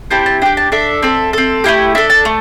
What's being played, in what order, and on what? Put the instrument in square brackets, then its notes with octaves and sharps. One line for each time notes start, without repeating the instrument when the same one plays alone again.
[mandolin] C4 E4 G4 A5
A5
D4 G4 G5
A5
D4 A4 E5
C4 A4
C4 A4
A3 C4 E4 G4
D4 A4 E5
A5
A3